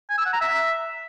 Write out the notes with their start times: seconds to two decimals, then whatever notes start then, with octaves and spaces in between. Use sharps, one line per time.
0.10 G#5
0.18 E6
0.26 F#5
0.33 A#5
0.41 E5